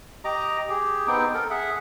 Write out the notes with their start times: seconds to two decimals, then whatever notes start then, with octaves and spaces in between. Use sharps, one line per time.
0.25 G4 D#5 A#5 D6
0.69 G4 G#4
1.07 B3 C4 D#4 G5
1.34 A4 A#4
1.50 G#4 E5 F#5